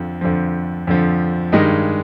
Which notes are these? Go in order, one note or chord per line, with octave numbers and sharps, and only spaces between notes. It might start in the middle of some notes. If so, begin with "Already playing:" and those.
Already playing: F2 D3 F3
F2 D3 F3
F2 D3 F3
G2 D#3 G#3 D#5